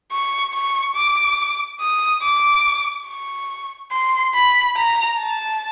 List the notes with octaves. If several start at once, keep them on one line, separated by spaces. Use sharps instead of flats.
C#6
C#6
D6
D#6
D6
C#6
C6
B5
A#5
A5